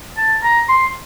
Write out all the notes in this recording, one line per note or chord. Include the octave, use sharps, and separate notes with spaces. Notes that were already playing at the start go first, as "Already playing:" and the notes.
A5
A#5
C6